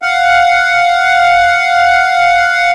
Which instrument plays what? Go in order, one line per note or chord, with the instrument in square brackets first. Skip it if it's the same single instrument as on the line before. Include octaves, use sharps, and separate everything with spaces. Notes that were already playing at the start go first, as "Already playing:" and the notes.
[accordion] F5 F#5